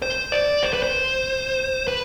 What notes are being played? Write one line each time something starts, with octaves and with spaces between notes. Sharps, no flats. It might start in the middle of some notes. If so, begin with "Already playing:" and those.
C5
D5
C5
B4
C5
B4